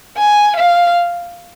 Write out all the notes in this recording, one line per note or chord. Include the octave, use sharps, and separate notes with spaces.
G#5
F5